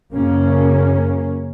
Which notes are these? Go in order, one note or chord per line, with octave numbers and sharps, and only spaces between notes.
F#2 C#3 A#3 C#4